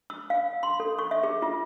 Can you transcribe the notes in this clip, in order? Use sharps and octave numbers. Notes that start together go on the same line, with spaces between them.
E6
F5
C6
A4
C#6
E5
G#4
F4